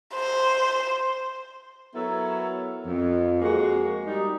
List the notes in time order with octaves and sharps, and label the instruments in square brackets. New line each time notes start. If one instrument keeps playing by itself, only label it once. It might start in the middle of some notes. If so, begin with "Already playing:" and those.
[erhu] C5
[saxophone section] F#3 B3 E4 A4 A#4 C#5
F2
G#3 A#3 F#4
G3 D#4